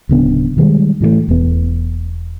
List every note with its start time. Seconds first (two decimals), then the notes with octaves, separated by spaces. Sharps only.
0.09 D1 C#3 B3 D4
0.57 B2 D#3 G3 G#3
1.01 A2 E3 F#3 A3
1.29 E1 E2 B3